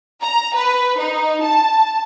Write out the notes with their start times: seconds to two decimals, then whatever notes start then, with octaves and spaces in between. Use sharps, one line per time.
0.22 A#5
0.55 B4
0.99 D#4
1.43 A5